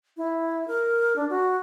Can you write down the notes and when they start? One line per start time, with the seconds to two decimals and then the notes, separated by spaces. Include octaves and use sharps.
0.17 E4
0.68 A#4
1.16 D4
1.30 F#4